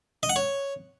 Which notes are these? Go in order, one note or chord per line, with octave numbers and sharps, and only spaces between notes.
D#5
F#5
C#5